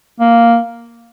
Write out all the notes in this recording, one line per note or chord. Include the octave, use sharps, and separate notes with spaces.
A#3